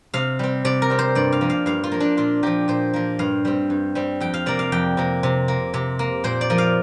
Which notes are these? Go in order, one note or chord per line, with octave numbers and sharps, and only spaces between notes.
C3 F5
G3 C4
C3 D5
A#4
G3 C4
C5
G2 D5
F5
F3 A#3
F5
G2 F5
F4
F3 A#3
D4
A#2 F4
F3 A#3 G4
A#2 C5
F3 A#3
G2 F5
G3 C4
G2
G3 C4
F2 G5
F5
C3 A#3 D5
F5
F2 G5
C3 A#3
C3
A#3
C3
A#3
A#2 C5
D5
F3 A#3
F5